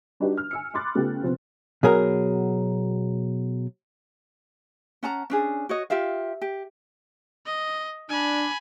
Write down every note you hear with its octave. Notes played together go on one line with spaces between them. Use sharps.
G3 D4 D#4 F#4 G4 B4
F6
G#5 E6 C#7
B5 C6 D6 F#6 A6
C#3 A3 B3 F4 G4
C3 F3 B3 C4
B2 F#3 G#4 A#4
C#4 F#5 A5 A#5
C#4 D4 G#4
F#4 C#5 D#5
F4 G4 E5 F5
G4
D#5
D4 G#5 B5